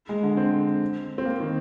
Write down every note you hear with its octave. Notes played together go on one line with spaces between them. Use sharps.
G#3
D3
C4
C4
A#3
D#3